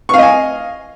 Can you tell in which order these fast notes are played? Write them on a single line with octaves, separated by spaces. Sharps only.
C#6 F5 D#5 G#5